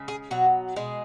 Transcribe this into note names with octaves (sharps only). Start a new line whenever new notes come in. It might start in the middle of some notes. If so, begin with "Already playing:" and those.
Already playing: C#3 G#3
G#4
B2 F#3 F#4
B2 G#3 G#4